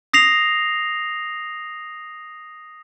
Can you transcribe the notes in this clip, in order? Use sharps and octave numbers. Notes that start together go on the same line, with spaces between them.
D#6 A#6 C7 F7